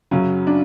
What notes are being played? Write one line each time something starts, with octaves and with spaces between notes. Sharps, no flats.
F#2 C#3 F#3 C#4
D4